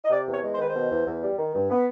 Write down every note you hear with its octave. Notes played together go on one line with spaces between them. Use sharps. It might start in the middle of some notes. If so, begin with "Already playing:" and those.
D#5
C3 D5
E2 C#5
G#3
C5
D#3 B4
C5
B2
E2
E2
G3
D#3
G2
B3